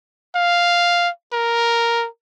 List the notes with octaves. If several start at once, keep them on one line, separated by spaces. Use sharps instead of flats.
F5
A#4